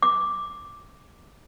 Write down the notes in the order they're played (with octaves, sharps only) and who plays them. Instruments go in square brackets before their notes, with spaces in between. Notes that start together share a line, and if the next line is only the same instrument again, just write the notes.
[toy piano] D6